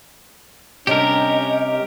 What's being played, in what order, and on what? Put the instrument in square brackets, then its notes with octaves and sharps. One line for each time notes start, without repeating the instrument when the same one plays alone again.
[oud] C3 G3 D4 [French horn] C#4 [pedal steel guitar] G4 A#4 [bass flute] D#5